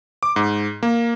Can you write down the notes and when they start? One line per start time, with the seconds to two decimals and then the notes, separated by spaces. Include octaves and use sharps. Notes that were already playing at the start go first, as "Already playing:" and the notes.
0.23 D6
0.36 G#2
0.83 A#3